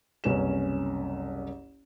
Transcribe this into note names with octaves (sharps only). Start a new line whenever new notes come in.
F#1 C2 C#4 B4 C#5 E7